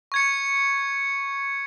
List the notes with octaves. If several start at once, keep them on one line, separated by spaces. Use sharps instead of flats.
C#6 G#6 C#7